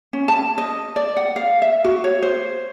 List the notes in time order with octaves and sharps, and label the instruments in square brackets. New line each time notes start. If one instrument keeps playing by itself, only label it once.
[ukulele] C#4
A5
D#5
D5
F#5
F5
E5
F#4
C#5
C5